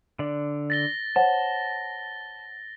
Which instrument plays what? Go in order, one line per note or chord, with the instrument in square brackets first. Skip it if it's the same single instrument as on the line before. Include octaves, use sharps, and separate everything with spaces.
[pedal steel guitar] D3 D5
[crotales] A6 A#6 G7
[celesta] C5 C#5 F#5 [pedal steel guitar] A5